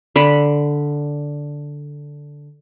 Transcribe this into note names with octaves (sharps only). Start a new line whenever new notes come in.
D3 B5